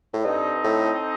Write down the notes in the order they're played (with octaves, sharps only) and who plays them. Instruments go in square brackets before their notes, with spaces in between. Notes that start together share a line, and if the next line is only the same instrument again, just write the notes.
[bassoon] A2
[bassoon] G2 [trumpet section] C4 D#4 A4 D#5
[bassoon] A2